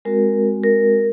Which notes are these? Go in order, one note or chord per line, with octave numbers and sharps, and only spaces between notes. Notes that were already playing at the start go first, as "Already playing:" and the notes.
G#3 C4 F#4 A#4
A#4